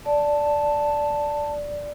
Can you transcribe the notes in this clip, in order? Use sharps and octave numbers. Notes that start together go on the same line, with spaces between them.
D5 A5